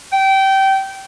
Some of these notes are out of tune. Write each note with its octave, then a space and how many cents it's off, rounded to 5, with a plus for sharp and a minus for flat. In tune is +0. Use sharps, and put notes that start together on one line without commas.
G5 -20